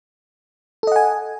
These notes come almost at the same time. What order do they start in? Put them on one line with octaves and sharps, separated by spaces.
A4 D#5 F#5 G#5